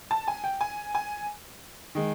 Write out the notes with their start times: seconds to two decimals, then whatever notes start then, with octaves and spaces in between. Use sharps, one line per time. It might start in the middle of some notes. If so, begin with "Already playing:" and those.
0.11 A5
0.28 G#5
0.44 G5
0.61 G#5
0.95 G#5
1.95 D#3 G#3